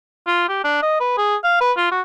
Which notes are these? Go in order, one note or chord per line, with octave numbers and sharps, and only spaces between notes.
F4
G4
D4
D#5
B4
G#4
F5
B4
F4
F#4